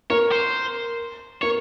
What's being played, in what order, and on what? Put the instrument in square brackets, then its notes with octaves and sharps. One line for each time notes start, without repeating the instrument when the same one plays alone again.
[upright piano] A#4 [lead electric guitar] C#5
[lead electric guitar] C5
[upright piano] A#4 [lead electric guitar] C#5